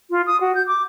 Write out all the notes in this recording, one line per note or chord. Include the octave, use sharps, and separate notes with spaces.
F4
D#6
F#4
G6
D6